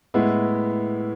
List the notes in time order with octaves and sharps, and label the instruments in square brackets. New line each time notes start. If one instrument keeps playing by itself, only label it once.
[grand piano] A2 G#3 B3 E4